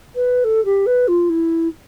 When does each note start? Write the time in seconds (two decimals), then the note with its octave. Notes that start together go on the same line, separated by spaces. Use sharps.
0.15 B4
0.44 A4
0.65 G4
0.86 B4
1.08 F4
1.30 E4